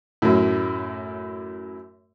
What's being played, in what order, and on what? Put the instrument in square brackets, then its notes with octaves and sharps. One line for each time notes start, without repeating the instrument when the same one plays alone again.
[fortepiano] F#2 A2